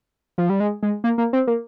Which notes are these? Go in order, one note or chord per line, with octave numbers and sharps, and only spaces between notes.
F3
G3
G#3
G#3
A#3
A#3
C4
A#3